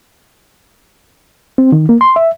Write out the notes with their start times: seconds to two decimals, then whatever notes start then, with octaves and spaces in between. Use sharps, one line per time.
1.58 C4
1.72 D#3
1.89 A#3
2.01 C6
2.16 E5